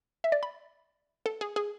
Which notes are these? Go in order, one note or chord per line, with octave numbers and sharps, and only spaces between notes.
E5
D5
B5
A4
G#4
G#4